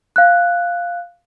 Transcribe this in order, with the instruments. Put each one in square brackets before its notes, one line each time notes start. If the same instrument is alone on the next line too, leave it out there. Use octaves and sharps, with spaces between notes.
[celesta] F5 F#6